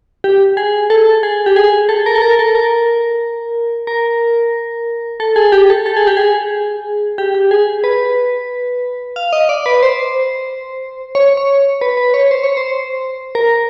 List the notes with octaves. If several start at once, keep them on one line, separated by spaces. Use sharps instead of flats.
G4
G#4
A4
G#4
G4
G#4
A4
A#4
A4
A#4
A4
A#4
A#4
A4
G#4
G4
A4
A4
G#4
G4
G#4
G4
G4
G#4
B4
F5
D#5
D5
B4
C5
C#5
C#5
B4
B4
C#5
C5
C#5
C5
A#4